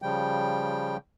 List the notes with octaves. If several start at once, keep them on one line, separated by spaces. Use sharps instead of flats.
C#3 F3 G3 G5